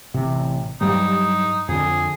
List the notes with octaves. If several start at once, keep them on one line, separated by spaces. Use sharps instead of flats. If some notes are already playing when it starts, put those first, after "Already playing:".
A1 C3
G2 F#3 G3 D#4
F2 D3 G#4